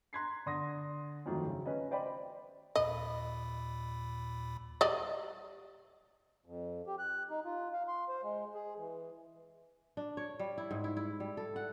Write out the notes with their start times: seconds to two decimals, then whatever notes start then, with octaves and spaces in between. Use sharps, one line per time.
0.13 A#5 C6 F#6 G#6 B6 C7
0.46 D3 C6 D#6 A#6
1.26 F2 D#3 F#3 A3 F#4
1.47 C#3
1.66 C#4 B4 D#5
1.91 C5 D5 D#5 G5 B5
2.75 D#2 A#2 D#5 B5
4.81 G3 D5 D#5
6.46 F2
6.87 G4
6.99 F#6
7.31 D#4
7.45 F4
7.73 F5
7.88 C6
8.09 C5
8.23 G#3
8.55 G#4
8.77 E3
9.97 D4
10.17 C#5
10.40 G3
10.58 E4
10.71 G#2
10.84 E4
10.97 E4
11.20 G3
11.37 A4
11.56 F#5